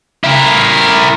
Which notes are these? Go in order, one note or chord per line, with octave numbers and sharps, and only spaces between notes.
E4 A#4